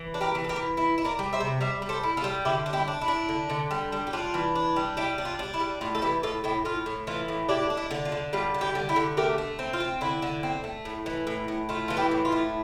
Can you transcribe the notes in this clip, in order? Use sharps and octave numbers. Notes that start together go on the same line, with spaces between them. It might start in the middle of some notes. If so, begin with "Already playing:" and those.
Already playing: E3
D4
G4 A#4
E3
A4
G4 A#4
E3
E4
E4
A#4 D5
G3
C5 E5
C3
G3 C5 E5
G3
A4 C5
E4
F4 A4
G3
D3 E4 G4
D4
E4 G4
D4
E4
D4
D3
D3
G3
G3
G4
D4 F4
E3
D4
G3
G3 E4 G4
D4
F4
D4
E4
G3
A2 F4
A4
E3 E4 G4
A2 F4 A4
A2 E4 G4
A2 F4
A2
E3 F4
A2
D4 E4 G4
D4
E4
D3
F4
D3
G3 F4
D3
E4 G4
D3
E4 G4
D3
A3 G4 A#4
A3
C4
F4
C4
D3 E4
D3
C4
A3
A2
E3
A2
A2
A3 F4
E3 F4
E4 G4
A2
F4
A3